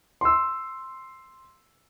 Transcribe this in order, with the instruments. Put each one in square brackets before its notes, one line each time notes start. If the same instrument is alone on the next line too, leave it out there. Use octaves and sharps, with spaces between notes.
[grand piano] C6 E6